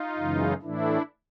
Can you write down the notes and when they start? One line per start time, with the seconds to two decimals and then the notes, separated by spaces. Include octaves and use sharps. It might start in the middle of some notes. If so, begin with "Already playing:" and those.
Already playing: D#4 F4
0.18 F#2 C#3 E3 G#3
0.62 A2 E3 A3 D4 E4